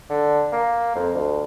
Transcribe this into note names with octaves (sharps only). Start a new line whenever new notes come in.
D3
A#3
F2
D2